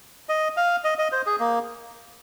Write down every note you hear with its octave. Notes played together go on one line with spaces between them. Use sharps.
D#5
F5
D#5
D#5
C5
G#4
A#3